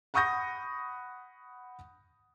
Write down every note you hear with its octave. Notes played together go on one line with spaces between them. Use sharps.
F#5 B5 C#6 D#6 G6 A#6